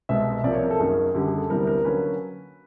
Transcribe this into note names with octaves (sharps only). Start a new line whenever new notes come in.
C2 B2 G#3 C4 E5
C2 C3 F3 A#3 D5
C#5
A#4
A4
F#2 D#3 F#3 A#3 C#4 G#4
F#2 D3 G3 G4
G#4
A4
D2 C3 E3 G3 B3 A#4
A#4
D3 F#3 A#3 C#4 B4